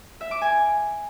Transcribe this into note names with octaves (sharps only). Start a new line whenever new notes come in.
E5
D6
G#5